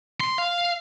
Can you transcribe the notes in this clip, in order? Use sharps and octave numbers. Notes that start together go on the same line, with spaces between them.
C6
F5